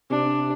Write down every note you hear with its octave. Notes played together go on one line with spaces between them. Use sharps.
C3 D4